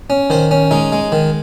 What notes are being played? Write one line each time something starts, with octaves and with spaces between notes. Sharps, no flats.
C#4
D#3 C5
C#4
G#3 D#4
G#3
D#3